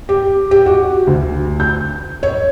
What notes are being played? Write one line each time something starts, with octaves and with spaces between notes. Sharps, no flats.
G4
G4
F#4
D2
G6
C#5